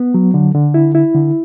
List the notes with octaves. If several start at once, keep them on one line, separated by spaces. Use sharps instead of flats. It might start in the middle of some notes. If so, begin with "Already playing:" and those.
Already playing: B3
F#3
D3
D3
E4
E4
D3